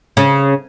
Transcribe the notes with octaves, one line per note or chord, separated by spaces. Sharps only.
C#3